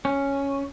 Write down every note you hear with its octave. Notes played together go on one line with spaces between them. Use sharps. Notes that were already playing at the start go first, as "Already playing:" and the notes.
C#4